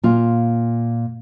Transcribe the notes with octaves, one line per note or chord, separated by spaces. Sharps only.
A#2 F4